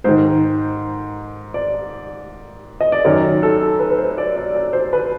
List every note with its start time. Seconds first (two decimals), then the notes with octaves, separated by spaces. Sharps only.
0.04 G#2 D#3 C5
1.54 D5
2.81 D#5
2.92 D5
3.05 F#2 D#3 C#5
3.43 A4
3.79 B4
3.90 B4
3.98 C5
4.18 D5
4.36 D5
4.55 D5
4.73 C5
4.93 B4